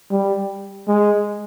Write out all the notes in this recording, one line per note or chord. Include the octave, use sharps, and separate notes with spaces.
G3
G#3